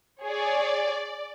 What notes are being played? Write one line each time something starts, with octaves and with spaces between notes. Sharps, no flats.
G#4 C#5 D5